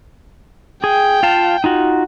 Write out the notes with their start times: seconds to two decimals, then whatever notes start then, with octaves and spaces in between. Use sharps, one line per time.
0.84 G#4 G5
1.23 F4 F5 A5
1.64 D#4 F4 F#4